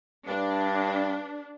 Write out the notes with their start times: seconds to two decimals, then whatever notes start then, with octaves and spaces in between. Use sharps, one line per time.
0.28 G2 D4